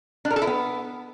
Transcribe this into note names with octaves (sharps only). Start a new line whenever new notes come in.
D4
A#4
A4
E4
B3